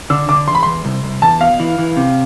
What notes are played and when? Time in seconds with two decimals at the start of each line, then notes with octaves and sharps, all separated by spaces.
0.10 D3 E6
0.29 D3 D6
0.48 E2 C6
0.55 B5
0.63 E2 C6
0.85 C2
1.03 C2
1.22 E2 A5
1.41 B2 F5
1.60 E3
1.78 E3
1.97 C3